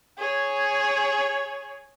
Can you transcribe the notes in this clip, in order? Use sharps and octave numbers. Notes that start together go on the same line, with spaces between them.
G#4 C#5